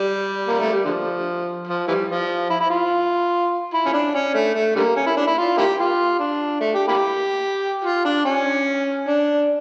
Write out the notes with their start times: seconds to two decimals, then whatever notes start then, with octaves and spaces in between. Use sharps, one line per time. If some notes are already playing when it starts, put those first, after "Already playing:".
Already playing: G3
0.47 A#3
0.60 A3
0.72 G3
0.85 D3 F3
1.67 F3
1.88 E3 G3
2.08 F3
2.50 E4
2.61 E4
2.70 F4
3.73 E4
3.86 C#4
3.93 D4
4.14 C#4
4.34 A3
4.55 A3
4.76 D3 G3 A#3
4.96 C#4
5.07 E4
5.17 D4
5.27 E4
5.38 F4
5.57 A#3 E4 G4
5.78 F4
6.19 D4
6.61 A3
6.74 G4
6.88 A#3 E4 G4
7.85 F4
8.05 D4
8.25 C#4
9.08 D4